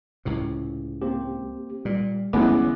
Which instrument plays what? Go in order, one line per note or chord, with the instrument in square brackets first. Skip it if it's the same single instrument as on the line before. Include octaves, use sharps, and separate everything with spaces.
[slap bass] C#2 A2 C3
[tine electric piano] A#3 C4 G4
[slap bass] A#2 [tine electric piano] G3
[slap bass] G1 [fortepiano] E3 G#3 B3 [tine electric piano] C#4 D6